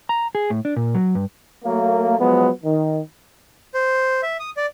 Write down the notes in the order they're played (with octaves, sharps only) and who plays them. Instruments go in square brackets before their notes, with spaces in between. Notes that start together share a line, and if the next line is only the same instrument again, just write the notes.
[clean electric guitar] A#5
G#4
A2
D4
A#2
F#3
G2
[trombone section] F#3 A3 A#3
F3 F#3 G#3 B3
D#3
[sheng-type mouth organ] C5
E5
D#6
D5